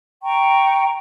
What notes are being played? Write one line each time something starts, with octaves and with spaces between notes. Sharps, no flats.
G5 A#5 C#6